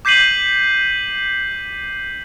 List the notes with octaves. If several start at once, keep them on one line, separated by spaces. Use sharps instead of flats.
D6 G6 B6 C7 D#7 F#7